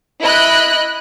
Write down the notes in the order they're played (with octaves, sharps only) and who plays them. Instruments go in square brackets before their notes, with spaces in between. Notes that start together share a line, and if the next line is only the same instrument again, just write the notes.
[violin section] E4 D#5 B5 F#6